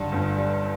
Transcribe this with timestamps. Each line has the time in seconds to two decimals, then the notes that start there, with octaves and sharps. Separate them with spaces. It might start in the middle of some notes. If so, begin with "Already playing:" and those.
Already playing: G2 D3 G3 F#5
0.12 G1
0.36 G3